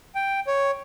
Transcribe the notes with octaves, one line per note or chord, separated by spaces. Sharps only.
G5
C#5